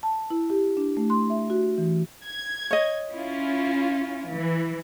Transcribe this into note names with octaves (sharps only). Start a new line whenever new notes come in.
A5
E4
G4
D4
A3
C6
E5
F#4
E3
G#6
C#5 D#5
C#4 E4 F4
E3